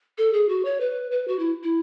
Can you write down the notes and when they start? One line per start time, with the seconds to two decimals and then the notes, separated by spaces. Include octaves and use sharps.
0.18 A4
0.33 G#4
0.49 F#4
0.65 C#5
0.80 B4
1.11 B4
1.28 F#4
1.39 E4
1.63 E4